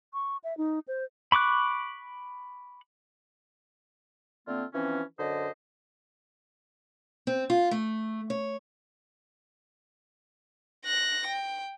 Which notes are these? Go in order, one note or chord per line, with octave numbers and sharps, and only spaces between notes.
C#6
E5
D#4
C5
B5 C#6 D6 F#6
D3 A3 A#3 C4 F4
E3 F3 C4 C#4
F#2 D3 C5 D#5
C4
F4
A3
C#5
F#6 A#6
G5